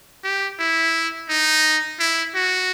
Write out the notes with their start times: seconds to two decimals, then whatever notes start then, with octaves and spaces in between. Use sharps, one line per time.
0.24 G4
0.59 E4
1.29 D#4
2.00 E4
2.35 F#4